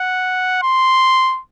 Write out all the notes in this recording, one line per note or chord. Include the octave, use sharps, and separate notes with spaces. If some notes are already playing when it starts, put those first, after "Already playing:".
Already playing: F#5
C6